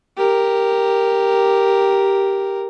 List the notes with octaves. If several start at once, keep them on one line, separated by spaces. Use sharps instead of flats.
G4 A#4